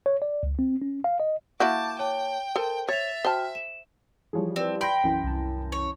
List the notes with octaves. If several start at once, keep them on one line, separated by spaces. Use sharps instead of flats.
C#5
D5
C#2
C4
C#4
F5
D#5
A#3 E4 F#4 A5 D6 G6
C#5 G5 A5
A4 A#4 C5 A5
C#5 E5 A6 F7
F#4 C5 G5 A5 F6
E7
E3 F3 G3 G#4 C#5
C4 B4 D5
G5 B5 C6 G6 A#6
B1 F#2 E3
C2 A5
C#5